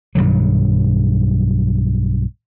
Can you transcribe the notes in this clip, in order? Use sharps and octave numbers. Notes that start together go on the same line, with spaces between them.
B1 G2 D#3 F#3